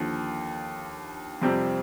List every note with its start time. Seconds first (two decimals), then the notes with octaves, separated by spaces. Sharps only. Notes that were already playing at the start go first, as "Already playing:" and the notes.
Already playing: D#2 D3 F3
1.42 F2 C3 G3 C4 G4